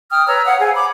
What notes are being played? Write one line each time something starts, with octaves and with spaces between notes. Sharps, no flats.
G5 D#6 F6
B4 C#5 A#5 E6
C#5 F5 F#5 D#6
G#4 C5 F5 G#5
B5 D6